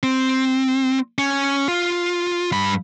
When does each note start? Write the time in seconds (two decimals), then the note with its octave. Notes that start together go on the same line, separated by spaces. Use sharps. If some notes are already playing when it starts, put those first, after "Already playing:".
0.03 C4
1.18 C#4
1.68 F4
2.52 G2 B5